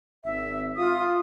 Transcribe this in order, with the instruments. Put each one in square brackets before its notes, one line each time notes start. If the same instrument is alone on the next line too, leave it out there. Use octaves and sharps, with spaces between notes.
[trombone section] G#1 [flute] E5
[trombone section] F4 [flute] D#6